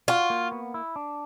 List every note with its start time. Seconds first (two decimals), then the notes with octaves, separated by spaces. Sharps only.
0.08 F4 F#4
0.30 A#3
0.52 B3
0.74 E4
0.96 D4